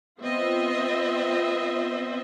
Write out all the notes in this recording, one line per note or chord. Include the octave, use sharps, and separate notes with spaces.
B3 C4 F4 C5 D#5 E5